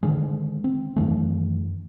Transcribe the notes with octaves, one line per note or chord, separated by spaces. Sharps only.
D3 D#3 G#3
C4
F#2 D#3 E3 A3